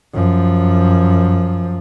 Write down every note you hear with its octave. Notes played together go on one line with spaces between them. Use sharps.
F#2 F3